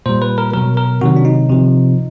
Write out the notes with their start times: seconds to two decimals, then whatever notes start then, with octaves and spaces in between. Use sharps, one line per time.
0.06 A#2 G3 C5
0.22 B4
0.38 A#4
0.53 B2 F#3 A#4
0.77 A#4
1.01 C3 D#3 F#3 F#4
1.16 D4
1.25 D#4
1.49 C3 F3